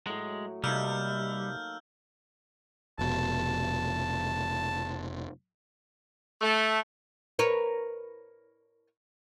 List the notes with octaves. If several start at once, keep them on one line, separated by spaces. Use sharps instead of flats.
A2 F#3 G#3
C3 G3 A#3 D#4 A4 E6 F6 G6
F1 B2 A5
A3
A#4 B4 C#5